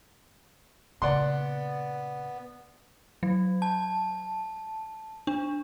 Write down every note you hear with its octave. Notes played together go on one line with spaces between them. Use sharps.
A#2 C#3 B3 D5 F#5 C6
F#3
A5
D4